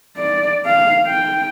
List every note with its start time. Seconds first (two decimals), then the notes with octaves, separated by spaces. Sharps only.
0.17 D5
0.66 F5
1.06 G5